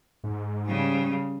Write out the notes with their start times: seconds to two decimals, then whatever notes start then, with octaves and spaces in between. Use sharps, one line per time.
0.24 G#2
0.65 C#3 G3